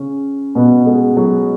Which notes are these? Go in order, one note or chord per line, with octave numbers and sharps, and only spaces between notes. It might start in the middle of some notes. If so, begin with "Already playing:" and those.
Already playing: C#3 C#4
B2 B3
G#3
F#3